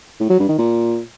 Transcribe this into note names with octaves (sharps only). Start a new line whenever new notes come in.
A2
F#3
G2
D#3
A#2